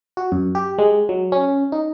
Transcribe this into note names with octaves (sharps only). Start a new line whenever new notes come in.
F#4
F#2
G4
G#3
F#3
C#4
D#4